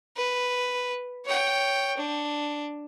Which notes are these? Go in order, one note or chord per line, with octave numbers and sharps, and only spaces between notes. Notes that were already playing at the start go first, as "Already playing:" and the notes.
B4
C#5 G5
D4